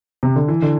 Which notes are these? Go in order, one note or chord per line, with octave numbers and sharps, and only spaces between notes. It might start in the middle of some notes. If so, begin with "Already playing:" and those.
C3
D3
E3
D3